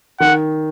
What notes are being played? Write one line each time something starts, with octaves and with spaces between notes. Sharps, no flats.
D#3 F#5